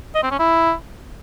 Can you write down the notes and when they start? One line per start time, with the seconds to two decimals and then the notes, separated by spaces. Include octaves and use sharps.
0.15 D#5
0.23 C4
0.31 C#4
0.39 E4